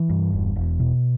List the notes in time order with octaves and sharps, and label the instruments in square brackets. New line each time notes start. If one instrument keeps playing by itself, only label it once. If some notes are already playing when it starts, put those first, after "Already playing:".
Already playing: [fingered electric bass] E3
G2
E1
E1
B2